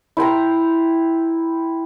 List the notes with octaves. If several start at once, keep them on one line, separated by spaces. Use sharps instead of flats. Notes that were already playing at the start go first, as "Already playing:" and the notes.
E4 C5 G5 A#5